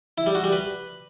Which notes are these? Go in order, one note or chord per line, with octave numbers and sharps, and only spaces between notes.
E4
G3
F#4
G3
B4